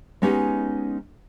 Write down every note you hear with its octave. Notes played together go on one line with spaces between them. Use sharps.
G#3 B3 C#4 D#4 G4